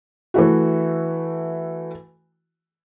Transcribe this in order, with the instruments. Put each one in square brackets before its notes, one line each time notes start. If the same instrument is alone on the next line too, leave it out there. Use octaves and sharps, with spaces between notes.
[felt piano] E3 A3 E4 F#4